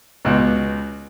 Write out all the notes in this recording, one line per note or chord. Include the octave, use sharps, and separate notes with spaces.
C#2 B2